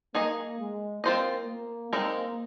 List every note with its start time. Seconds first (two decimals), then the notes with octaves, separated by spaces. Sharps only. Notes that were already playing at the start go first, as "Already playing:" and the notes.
0.15 A#3 D#4 G#4 D#5
0.60 G#3
1.04 A#3 C4 F4 C5 D#5
1.48 A#3
1.93 G#3 A#3 C4 D#4 A#4